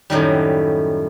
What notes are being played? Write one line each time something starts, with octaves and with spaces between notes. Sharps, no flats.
F#2 A2 D#3 G3